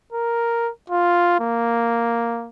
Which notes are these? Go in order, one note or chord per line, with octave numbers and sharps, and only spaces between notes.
A#4
F4
A#3